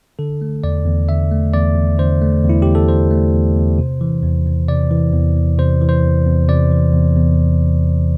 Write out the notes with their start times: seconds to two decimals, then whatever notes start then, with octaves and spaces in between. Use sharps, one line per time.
0.19 D3 A4
0.41 A3
0.64 E2 D5
0.86 E2
1.09 D3 E5
1.32 A3
1.54 E2 D5
1.76 E2
1.98 D3 C5
2.21 A3
2.44 E2
2.49 E4
2.62 E2 G4
2.75 A4
2.88 D3 C5
3.11 A3
3.34 E2
3.55 E2
3.79 C3
4.01 E3
4.23 E2
4.46 E2
4.68 C3 D5
4.91 E3
5.13 E2
5.36 E2
5.58 C3 C5
5.81 E3
5.89 C5
6.03 E2
6.26 E2
6.48 C3 D5
6.71 E3
6.93 E2
7.16 E2